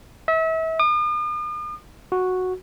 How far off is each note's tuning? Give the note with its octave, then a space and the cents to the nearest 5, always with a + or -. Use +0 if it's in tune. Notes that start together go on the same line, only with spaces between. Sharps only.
E5 -35
D#6 -45
F#4 -5